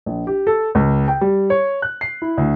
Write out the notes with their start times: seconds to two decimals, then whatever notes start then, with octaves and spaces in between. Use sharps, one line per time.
0.06 A#1
0.27 G4
0.47 A4
0.75 C#2
1.08 G5
1.21 G3
1.50 C#5
1.82 F#6
2.01 C7
2.22 E4
2.37 D2